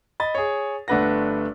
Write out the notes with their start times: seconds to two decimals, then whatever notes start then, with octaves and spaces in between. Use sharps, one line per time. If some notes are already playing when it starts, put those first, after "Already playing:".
0.20 D#5 B5 A6
0.35 G#4 C#5
0.88 G1 A3 D4 B4 F#5 A#6